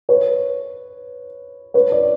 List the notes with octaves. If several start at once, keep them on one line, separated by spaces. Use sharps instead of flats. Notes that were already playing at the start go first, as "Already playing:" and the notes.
B4 C#5
B4 C#5
D5